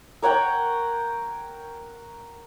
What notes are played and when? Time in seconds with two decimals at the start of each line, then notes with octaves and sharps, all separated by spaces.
0.22 A#4 C#5 F#5 G5